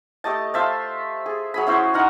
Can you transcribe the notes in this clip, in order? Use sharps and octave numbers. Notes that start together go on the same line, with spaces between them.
A3 G4 D#5 A5
F4 C5 E5 A5
G#4
F#3 G#4 B5
C#4 E4 F#4 C5
D#4 A#4 F#5